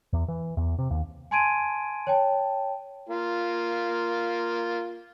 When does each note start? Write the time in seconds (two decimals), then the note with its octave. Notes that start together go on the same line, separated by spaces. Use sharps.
0.13 E2
0.28 E3
0.57 E2
0.79 C3
0.90 D#2
1.31 G#5 A5 C6 G#6 D7 D#7
2.07 C#5 G5 A5
3.09 A#3 F4